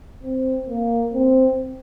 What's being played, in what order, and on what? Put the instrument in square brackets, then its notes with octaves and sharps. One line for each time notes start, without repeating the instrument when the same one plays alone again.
[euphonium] C4
A#3
C4